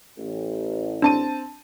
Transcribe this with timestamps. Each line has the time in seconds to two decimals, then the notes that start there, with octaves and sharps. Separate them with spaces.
0.18 A1
1.02 C4 D4 A5 D#7